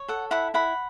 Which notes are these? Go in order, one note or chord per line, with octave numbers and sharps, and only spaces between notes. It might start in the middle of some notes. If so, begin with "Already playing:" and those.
Already playing: C#5
A4 F#5
E4 F#5 B5
E4 F#5 B5